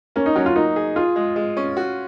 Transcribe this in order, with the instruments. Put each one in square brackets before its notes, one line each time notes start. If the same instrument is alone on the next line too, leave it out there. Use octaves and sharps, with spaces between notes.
[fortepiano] A#3 [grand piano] C#4
[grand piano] D#4
[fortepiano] F#3 [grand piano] C#4
[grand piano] F4
[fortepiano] A#3 [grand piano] D#4
[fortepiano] G#4
[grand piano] F4 [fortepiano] G#4
[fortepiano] G#3
G#3
C#4
F#4